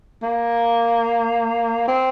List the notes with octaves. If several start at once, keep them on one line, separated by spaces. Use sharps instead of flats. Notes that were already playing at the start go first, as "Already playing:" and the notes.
A#3
C4